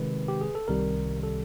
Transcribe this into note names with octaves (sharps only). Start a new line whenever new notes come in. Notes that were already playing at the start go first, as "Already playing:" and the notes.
Already playing: C3 D#3 G#3 B4
G4
G#4
A4
C2 C3 D#3 G3 A#4
A4